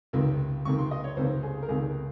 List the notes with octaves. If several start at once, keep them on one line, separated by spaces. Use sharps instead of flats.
C#2 C3 D#3
C#2 C3 D#3 C#6
C6
D#5
C#5
C#2 C3 D#3 C5
G#4
A#4
C#2 C3 D#3 G#4